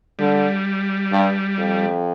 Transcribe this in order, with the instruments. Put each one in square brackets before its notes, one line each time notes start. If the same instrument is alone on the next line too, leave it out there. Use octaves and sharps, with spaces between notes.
[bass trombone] D3 [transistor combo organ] G3
[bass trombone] G2
F2